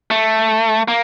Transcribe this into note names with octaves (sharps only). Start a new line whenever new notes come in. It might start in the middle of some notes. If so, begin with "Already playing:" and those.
A3
A#3